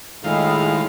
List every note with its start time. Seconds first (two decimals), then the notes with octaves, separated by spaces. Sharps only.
0.24 A2 D#3 G#3 E4 F4 F5